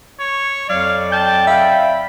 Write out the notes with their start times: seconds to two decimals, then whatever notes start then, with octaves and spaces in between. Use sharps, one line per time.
0.20 C#5
0.70 F2 F#3 D5 F5
1.12 G5 A5 G6
1.47 E5 F5 B5